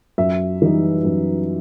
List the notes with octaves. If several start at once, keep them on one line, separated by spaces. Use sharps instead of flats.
F#2 E5
E3 G3 D#4
F#2